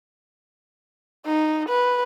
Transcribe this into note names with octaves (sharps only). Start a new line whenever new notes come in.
D#4
B4